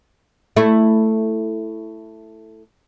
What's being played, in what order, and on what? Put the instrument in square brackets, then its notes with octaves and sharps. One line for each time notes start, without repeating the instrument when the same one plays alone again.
[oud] A3 E4